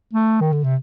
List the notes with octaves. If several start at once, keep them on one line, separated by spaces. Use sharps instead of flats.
A3
D#3
D3
C3